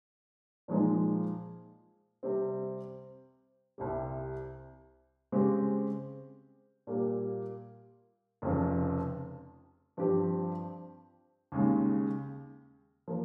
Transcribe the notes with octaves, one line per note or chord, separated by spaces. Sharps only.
A#2 F3 G#3 D#4
C3 G3 C4
C2 C3 G3
C#3 G#3 C4 G4
A#2 G3 A#3
F1 F2 C#3 F3
G2 F3 C4 G4
D#2 C#3 G#3
F3 A#3